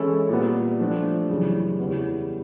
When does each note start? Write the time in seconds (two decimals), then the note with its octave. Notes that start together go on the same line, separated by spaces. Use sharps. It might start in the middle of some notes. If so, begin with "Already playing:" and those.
Already playing: E3 G#3 C#4 E4 A4
0.29 A#2 G3 B3
0.80 F3 A3 D4
1.30 F#2 C#3 E3 G3
1.79 E2 C#3 E3 G3 B3